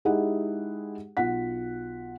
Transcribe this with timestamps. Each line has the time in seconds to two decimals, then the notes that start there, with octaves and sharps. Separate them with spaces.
0.05 G#3 D#4 E4 G4 G#4 F#5
1.17 B1 F4 F#5 B6